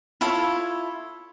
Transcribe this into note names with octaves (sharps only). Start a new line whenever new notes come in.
E4 F4 A4 C#5